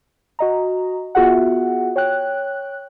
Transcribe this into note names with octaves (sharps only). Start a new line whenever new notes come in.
F#4 D#5 A#5
B3 F4 F#4 G#4 E5 F#5
C#5 G5 F#6